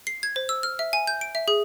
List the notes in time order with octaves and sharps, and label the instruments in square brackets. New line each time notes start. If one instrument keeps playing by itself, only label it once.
[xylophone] C7
G#6
C5
E6
F6
E5
G#5
G6
D7
E5
G#4